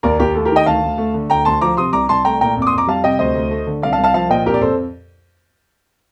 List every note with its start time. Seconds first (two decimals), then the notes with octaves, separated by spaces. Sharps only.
0.03 D#2 A#4 D5
0.19 D#2 G4 A#4
0.35 A3 A4
0.45 G4 A#4
0.52 D#3 D#5 G5
0.66 D2 F5 A5
0.83 D2
0.98 A3
1.14 D3
1.29 D2 G5 A#5
1.45 D2 A5 C6
1.61 F3 A#5 D6
1.77 C3 C6 D#6
1.93 C2 A#5 D6
2.09 C2 A5 C6
2.25 A3 G5 A#5
2.41 A#2 G5 A#5
2.56 F2
2.62 D6
2.67 C6 D#6
2.72 F2
2.78 A#5 D6
2.87 G3 F5 A5
3.04 C3 D#5 G5
3.19 D2 C5 D#5
3.35 D2
3.51 A3
3.67 D3
3.82 C2 D5 F5
3.93 F5 A5
3.98 C2
4.04 F5 A5
4.14 F3 F5 A5
4.30 A#2 D#5 G5
4.46 F2 G4 A#4
4.54 D5
4.61 F2 A4 C5